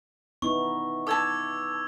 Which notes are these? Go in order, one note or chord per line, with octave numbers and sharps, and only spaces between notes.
B3 D#4 E4 C#6
A4 A5 D6 E6 G#6